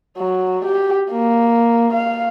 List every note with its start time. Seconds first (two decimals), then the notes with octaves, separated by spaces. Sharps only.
0.17 F#3
0.65 G4
1.11 A#3
1.93 F5